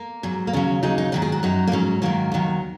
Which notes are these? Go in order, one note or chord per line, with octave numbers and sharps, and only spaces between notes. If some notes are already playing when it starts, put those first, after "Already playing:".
Already playing: A#3
G#2 F#3
A#3
D#2 C#3 F#3 C#4
D#2 C#3 F#3 D#4
D#4
G#2 D#3 F#3 F#4
G#4
F#4
F#2 F#3 D#4
A#3
G#2 F#3 C#4
G#2 D#3 F#3 A#3
D#2 D#3 F#3